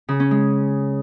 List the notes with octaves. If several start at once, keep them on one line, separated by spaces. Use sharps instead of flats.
C#3
C#4
G#3